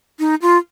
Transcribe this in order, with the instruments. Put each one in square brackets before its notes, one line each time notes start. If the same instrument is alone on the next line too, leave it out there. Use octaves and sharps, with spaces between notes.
[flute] D#4
F4